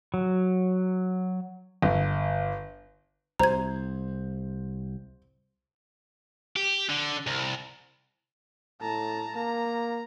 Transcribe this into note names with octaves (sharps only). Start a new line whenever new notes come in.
F#3
G1
C2 C5 A#5 G#6
G4
D3
C2
A2 A5 A#5
A#3 A#5